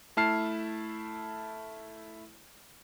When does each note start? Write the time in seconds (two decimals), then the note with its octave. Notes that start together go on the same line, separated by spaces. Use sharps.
0.17 A3 E4 A5 F6 C7